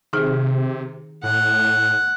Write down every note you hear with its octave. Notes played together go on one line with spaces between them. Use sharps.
C3 D#3 D#4 G#4
A2 F#5